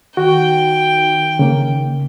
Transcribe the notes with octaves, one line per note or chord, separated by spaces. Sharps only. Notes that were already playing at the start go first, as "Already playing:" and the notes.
D#3 F#4 G5
C#3 A#3